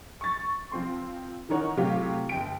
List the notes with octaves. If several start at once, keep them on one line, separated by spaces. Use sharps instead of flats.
C#6 A6
F3 C4 C6
D#3 E3 D#4 A#4 C#5 F#5
A2 C3 F#3 C4 F4 G4
G1 G5 D7